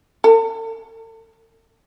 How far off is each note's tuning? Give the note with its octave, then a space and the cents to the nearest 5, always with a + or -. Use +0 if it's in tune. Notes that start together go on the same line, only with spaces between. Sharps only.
A4 +45